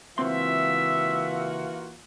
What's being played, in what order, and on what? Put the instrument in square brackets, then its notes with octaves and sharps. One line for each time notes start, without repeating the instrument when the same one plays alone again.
[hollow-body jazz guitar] C#2 C4 C6 [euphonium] E3 [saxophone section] A#3 F4 F#4 [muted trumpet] E5